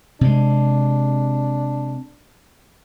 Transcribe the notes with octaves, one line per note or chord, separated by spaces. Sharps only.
C3 G#3 D4